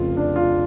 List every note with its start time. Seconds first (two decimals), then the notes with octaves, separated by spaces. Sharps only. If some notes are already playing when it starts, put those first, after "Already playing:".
Already playing: F1 F2 C#3 F4
0.17 D4
0.36 F4